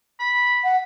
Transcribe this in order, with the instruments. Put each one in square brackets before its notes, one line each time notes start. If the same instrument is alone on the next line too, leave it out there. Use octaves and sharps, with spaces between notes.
[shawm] B5
[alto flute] F#5